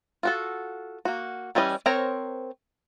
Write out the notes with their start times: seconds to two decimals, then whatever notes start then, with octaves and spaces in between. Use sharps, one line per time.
0.23 F4 F#4 A4
1.05 A#3 F#4
1.55 E3 G3 C#4 D#5
1.86 C4 A#4 C5 C#5 A#5